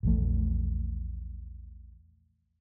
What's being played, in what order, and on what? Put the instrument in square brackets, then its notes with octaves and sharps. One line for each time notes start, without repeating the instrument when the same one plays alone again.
[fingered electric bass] A#1 E2 A3